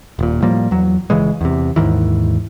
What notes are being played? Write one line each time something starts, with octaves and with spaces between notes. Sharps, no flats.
D#1 A#2
A2 F3 G3 A#3
E2 F#3
G1 C#3 E3 G#3
E2 C3
D#2 G#2 D#3 E3